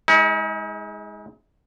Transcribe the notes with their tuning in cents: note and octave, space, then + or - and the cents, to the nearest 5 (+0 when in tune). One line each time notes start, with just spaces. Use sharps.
G#3 +0 D#4 +45